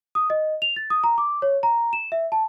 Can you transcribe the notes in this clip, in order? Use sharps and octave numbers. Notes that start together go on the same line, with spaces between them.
D#6
D#5
F7
A6
D#6
A#5
D6
C#5
A#5
E7
E5
A5